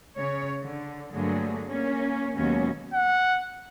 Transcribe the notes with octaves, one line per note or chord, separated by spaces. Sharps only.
C#3 C#5
D3
G2 D3 F#3 A3 A#3 G#4
A#3 C#4
D#2 B2 F#3 G#3 C#4
F#5